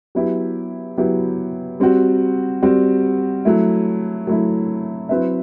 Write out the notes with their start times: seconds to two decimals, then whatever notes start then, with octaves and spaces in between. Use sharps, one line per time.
0.15 F#3 B3 E4 G4
0.98 F#3 B3 E4 G4
1.80 G3 C4 F#4
2.62 G3 C4 F#4
3.45 F#3 A3 E4
4.27 F#3 A3 E4
5.09 F#3 C4 E4 B4 E5